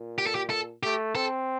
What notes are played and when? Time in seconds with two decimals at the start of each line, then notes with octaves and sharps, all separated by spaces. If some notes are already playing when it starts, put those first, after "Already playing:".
Already playing: A#2
0.18 G4
0.27 A4
0.35 G4
0.50 A4
0.83 A3 G4
1.15 C4 A4